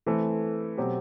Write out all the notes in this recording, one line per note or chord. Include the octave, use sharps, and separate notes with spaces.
E3 A3 C4
B2 F#3 C4 G4